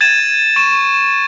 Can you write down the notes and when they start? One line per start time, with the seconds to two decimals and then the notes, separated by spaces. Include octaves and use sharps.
0.01 G#6 A6 D#7 E7
0.56 C#6 E7